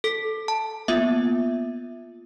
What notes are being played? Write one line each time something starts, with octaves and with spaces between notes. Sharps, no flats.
A4 B6
A5
A#3 B3 F4 E5